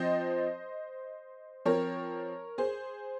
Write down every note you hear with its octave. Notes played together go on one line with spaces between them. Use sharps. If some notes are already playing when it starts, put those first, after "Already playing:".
Already playing: F3 C4 C5 D#5
F3 C4 A#4 C#5
G#4 C5